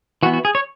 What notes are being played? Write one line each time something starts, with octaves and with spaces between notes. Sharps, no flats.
E3 B3 F#4
F#4
G#4
C#5